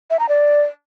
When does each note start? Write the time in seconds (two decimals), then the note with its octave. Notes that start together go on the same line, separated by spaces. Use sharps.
0.10 E5
0.19 A#5
0.29 D5